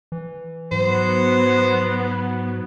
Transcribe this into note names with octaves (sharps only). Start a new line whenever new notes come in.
E3
G#2 F#3 B3 C5